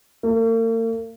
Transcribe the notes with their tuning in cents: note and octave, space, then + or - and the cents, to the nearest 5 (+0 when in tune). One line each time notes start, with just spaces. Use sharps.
A#3 -45